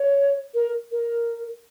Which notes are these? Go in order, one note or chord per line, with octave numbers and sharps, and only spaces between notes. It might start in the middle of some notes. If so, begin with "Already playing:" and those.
Already playing: C#5
A#4
A#4